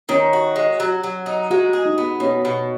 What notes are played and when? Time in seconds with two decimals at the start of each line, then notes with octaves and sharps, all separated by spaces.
0.09 D#3 C#4
0.33 F#4
0.56 G#3
0.80 F#3
1.04 F#3
1.26 D#4
1.50 G#3 F#4
1.73 G#4
1.85 D#4
1.98 B3
2.20 B2 C#4
2.45 B2